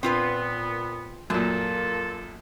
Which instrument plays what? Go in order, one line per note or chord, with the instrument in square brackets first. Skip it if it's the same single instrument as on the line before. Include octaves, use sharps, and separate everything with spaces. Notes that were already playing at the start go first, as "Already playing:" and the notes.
[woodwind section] A#2 B3 [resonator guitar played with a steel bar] C4 F4 B4
[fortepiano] F#2 A#2 [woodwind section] A#3 F4 A4 [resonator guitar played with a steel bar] A5